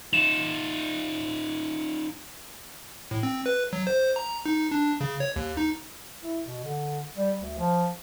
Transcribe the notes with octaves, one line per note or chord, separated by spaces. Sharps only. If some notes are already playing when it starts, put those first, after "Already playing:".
D#4 F4 E7
A2
C4
B4
F#3
C5
A#5
D#4
D4
C#3
C#5
D#2
D#4
E4
B2
D3
G3
D2
F3